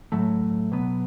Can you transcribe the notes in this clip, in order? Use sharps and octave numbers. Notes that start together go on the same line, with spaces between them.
A2 F#3 A3
B2 F#3 B3